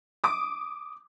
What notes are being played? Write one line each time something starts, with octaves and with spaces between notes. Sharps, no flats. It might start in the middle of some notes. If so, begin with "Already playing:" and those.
D6 D#6